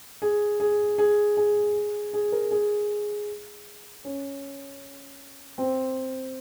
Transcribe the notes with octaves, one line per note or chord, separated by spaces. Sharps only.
G#4
G#4
G#4
G#4
G#4
A#4
G#4
C#4
C4